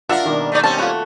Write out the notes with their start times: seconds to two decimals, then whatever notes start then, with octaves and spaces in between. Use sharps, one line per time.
0.09 D4 F4 A#4 E5 F#5
0.25 B2 D#3 G3 A#3
0.52 A3 D#4 D5
0.63 G3 C4 C#4 F5 A5
0.79 A3 F4 F#4 A4 B4